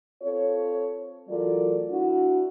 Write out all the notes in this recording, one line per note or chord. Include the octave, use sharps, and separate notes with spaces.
C4 F4 A4 C#5
E3 F#3 A3 F4 A#4 D5
D4 E4 F#4